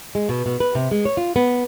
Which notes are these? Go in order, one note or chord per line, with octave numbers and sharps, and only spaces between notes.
G#3
B2
B2
B4
C3
G#3
C#5
F4
B3